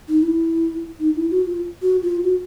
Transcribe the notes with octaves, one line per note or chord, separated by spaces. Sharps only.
D#4
E4
D#4
E4
F#4
F4
F#4
F4
F#4